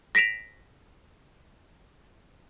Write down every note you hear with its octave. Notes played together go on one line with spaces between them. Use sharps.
A#6 B6 D7 E7 F7